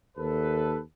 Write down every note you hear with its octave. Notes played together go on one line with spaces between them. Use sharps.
D#2 A4 B4